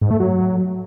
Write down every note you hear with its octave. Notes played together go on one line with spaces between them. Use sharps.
G#2
A3
F#3